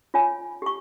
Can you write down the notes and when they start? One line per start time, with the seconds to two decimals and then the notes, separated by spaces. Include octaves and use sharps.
0.14 F4 C#5 G#5
0.62 G4 C#6